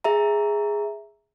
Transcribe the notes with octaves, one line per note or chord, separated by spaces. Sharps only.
G#4 E5 A#5